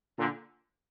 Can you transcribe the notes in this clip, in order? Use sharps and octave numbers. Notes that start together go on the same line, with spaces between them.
A#2 D3